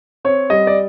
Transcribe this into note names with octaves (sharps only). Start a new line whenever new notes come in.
C4 C#5
G3 D#5
D5